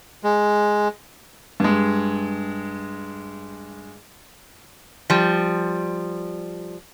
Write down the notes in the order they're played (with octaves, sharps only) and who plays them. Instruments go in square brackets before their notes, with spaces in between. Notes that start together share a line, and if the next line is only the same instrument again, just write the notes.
[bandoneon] G#3
[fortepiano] G2 G#3
[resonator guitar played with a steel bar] F3 G3